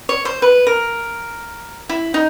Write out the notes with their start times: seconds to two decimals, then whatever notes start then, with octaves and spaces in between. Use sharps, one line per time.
0.09 C#5
0.25 C5
0.42 B4
0.67 A#4
1.89 E4
2.14 D#4